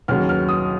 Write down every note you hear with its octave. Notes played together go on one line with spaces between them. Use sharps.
D#2 C#3 F#3 F6
F6
D#6